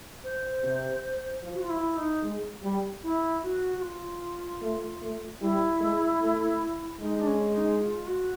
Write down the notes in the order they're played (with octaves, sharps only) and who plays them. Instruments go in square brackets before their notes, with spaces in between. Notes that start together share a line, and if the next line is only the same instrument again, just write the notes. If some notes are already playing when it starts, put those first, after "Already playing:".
[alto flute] C5
[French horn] C3
F3
[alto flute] F#4
F4
E4
D#4
[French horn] G#3
G3
[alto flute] E4
F#4
F#4
F4
[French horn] A3
A3
[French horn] G3 [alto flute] E4
[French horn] G#3
A3
[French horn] G#3 [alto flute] D#4
[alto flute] D4
C#4
D#4
F4
F#4